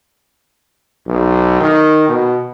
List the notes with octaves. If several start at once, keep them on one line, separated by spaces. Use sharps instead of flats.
B1
D#3
B2